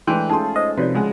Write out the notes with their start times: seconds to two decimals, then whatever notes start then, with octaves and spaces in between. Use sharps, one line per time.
0.07 E3 G#3 A3 D4 G5 C6
0.30 C#4 D#4 F4 G#4 A4 A5 C6
0.56 C5 C#5 D#5
0.77 C3 F3 D#4 F#4 B4 C#5 D5
0.94 C#2 G#3 F#5